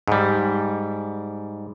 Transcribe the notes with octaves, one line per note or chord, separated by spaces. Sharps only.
G#2 G3